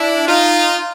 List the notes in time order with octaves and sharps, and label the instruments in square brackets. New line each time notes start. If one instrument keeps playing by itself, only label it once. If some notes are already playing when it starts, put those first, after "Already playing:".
Already playing: [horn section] D4 E4
D#4 F4